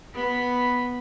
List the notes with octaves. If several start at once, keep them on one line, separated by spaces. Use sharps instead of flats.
B3 B5